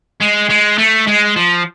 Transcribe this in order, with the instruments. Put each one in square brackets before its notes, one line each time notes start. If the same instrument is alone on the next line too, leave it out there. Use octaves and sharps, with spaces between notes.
[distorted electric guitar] G#3
G#3
A3
G#3
F3